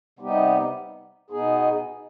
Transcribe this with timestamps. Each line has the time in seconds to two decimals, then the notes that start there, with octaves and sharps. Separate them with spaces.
0.19 C3 G3 B3 D#4 G4
1.30 B2 B3 D#4 G#4